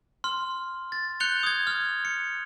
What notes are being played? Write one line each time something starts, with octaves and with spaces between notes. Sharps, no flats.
C6 F6
A6
F#6 G6 C#7 F7 G7
D#6 G#6
F6 G#6
C#7